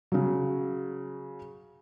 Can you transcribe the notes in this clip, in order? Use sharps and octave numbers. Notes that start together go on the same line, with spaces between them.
C#3 F#3